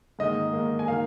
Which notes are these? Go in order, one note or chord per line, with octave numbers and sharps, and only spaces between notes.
G#2 D#3 A#3 D#5
G#2 D#3 A#3
G#5
D#3 A#3 F5